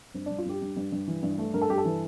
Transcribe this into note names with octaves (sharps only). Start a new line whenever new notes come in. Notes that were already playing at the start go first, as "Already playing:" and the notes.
G2 C4
G2 D4
F4
G2 G4
G2
G2
G2
E3
G2
A3
G2 A#4
A4
G2 G4
A4
E3